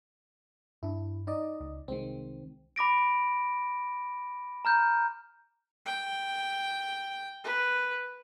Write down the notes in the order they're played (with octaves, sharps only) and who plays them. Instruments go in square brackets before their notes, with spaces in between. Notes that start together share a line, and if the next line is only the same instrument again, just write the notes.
[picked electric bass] G2 D4 [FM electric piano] E4
[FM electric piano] D#4 D5 D#5
[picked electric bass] C#2
[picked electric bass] C2 [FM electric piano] D#3 G#3 C4
[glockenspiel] B5 D6 A#6 D7
A#5 F6 G6
[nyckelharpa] G5
B4